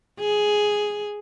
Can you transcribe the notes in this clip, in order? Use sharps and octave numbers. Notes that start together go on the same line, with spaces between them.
G#4